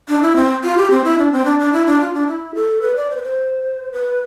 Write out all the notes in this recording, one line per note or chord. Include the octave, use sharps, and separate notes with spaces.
D4
E4
C4
F4
G4
C4
E4
D4
C4
D4
D4
E4
D4
F4
D4
E4
A4
B4
D5
C5
B4
C5
B4